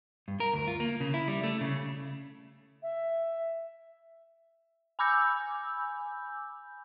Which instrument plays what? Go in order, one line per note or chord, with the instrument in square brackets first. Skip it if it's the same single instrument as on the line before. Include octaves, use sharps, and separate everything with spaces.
[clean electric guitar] G2
A#4
D2
F4
A#3
C#3
E4
G3
A3
C#3
[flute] E5
[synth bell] G#5 B5 D6 E6 G6